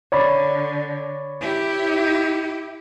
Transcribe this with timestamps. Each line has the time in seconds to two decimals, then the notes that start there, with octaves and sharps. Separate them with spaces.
0.12 D3 C#5 D5 B5
1.41 E4 G4